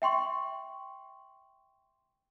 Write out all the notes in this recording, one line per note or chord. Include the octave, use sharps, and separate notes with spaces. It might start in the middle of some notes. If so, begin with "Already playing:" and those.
E5 G5 C6 C#6